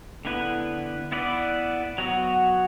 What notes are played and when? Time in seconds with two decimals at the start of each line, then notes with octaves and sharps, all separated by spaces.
0.25 D3 B3 E4 B4
1.12 B3 E4 B4 D5
1.98 F#3 B3 F#4